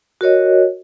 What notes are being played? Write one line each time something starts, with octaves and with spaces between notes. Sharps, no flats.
F#4 A#4 C#5 D#5